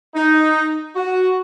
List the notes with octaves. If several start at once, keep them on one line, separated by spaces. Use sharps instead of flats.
D#4
F#4